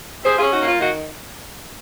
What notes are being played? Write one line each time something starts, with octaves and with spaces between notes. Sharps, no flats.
C3 G#4 C5
F4 G#4
C#4
D#4 F#4
A#3
F4
D#3 D#4 F#4